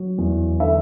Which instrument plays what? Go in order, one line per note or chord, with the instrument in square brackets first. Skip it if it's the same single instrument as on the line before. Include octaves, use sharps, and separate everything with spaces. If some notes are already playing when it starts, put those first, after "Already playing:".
Already playing: [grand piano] F#3
E2
D3 E5